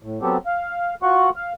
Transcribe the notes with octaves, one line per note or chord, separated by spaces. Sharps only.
A2
F#3 B3 C4 G4 A4
F5
F4 F#4 F#5 C#6
F5